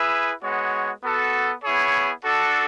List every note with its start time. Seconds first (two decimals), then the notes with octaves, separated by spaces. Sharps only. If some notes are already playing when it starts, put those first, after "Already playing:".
Already playing: E4 G#4 B4 E5
0.43 G#3 B3 F#4 C#5
1.04 B3 F#4 A4
1.63 B3 E4 G#4 C#5
2.24 D4 F#4 A4